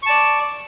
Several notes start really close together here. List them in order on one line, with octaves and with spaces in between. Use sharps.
C#6 A5 D5